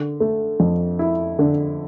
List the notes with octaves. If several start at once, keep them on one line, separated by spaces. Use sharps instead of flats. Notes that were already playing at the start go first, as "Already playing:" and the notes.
Already playing: D3
A3
F2
E4
D3